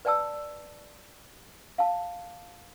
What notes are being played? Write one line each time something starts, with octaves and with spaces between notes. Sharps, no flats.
B4 D5 G5 A5 E6
F5 A5